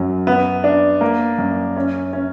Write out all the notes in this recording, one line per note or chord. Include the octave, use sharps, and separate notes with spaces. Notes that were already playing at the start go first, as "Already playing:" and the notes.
Already playing: F#2 F#3
B3
D4
A#3
F#2
C#4
C#4